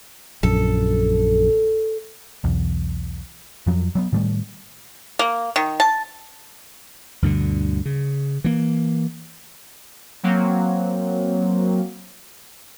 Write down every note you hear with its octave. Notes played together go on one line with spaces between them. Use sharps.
A#1 F#2 A4
B1 E2
F2 F3 F#3
F#3 A3 B3
A2 D#3 G3 A3
A#3
D#3
A5
D2 G2 B2 D3
C#3
E3 A#3
F#3 A#3 C4